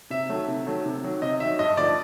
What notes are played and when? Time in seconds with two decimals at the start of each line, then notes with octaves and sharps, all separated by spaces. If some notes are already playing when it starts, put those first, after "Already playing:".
0.10 C3 E5
0.29 D#3 F#3 A3
0.48 C3
0.66 D#3 F#3 A3
0.86 C3
1.03 D#3 F#3
1.22 C3 D#5
1.40 D#3 F#3 E5
1.59 G2 D#5
1.77 D3 F3 A3 D5